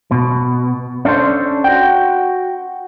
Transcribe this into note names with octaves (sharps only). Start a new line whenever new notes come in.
B2
C#4 D4 A4 C5
F#4 G5